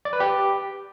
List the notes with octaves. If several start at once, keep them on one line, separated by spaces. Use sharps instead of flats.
D5
B4
G4